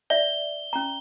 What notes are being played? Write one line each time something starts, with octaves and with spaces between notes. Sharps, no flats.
D5 E5 G7
C#4 A#5